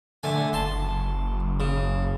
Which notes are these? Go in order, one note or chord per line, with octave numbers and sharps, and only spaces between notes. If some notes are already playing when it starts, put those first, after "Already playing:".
D3 A3 G#5
F#1 A5 C6
C#3